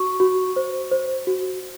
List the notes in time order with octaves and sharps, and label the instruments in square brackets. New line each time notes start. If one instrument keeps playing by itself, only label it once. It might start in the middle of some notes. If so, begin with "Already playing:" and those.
Already playing: [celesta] F#4 C#6
F#4
C5
C5
F#4